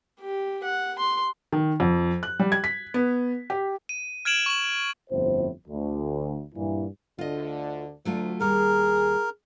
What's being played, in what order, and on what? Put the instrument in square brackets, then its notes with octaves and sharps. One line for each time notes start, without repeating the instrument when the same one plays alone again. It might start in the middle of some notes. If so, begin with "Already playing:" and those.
[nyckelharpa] G4
F#5
C6
[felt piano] D#3
F2
F#6
G3
G#6
B6
B3
G4
[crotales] D#7
F6 G#6 D7 E7 F#7
C#6 F#7
[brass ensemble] G1 F2 A2 C5
D2
G2 A#2 E3
[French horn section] D2 D3 [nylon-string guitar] F4 D#5
[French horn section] D2 [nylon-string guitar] F#3 A3 F4
[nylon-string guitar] D#2 G3 [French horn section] G#4 [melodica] A#4